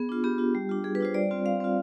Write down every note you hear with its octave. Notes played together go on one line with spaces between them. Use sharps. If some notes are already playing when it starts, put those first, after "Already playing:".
Already playing: B3 G#4
D4 F4
B3 G4
D4 F4
G3
D4 F4
G3 G#4
B4
D4 F4 C5
G3 D5
C4 F4
G3 F5
C4 F4